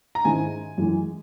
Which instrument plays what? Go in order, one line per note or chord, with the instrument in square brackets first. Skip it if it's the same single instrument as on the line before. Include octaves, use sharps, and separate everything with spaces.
[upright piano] A#5
G#2 D#3 G#3 C#4 E4 G#5
F#2 E3 G#3